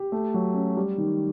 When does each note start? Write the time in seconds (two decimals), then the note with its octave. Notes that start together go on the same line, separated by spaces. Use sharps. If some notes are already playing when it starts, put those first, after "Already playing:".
Already playing: G4
0.12 A3
0.34 F#3
0.54 C#4
0.77 G3
0.98 D#3